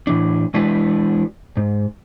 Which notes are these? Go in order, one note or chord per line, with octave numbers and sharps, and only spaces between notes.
A2 E3 D4
E3 G#3 D4 E4 F#4 B4
G#2